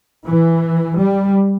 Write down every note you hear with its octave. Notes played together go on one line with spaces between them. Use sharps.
E3
G3